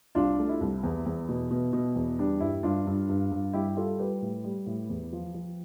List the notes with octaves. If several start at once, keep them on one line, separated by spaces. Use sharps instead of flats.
C2 D4 F4
A3
E4
C2
E2
E2
B2
B2
B2
E2
G3 D4
G2 E4
G2 D4 F4
G2
G2
G2
G3 E4 G4
G3 F4 A4
G3 G4 B4
A2
G3
A2
E2
F3
F3